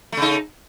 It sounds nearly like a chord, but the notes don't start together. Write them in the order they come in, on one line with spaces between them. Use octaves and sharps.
A3 C#3 D#4